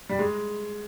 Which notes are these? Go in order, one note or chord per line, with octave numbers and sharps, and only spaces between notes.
G3
G#3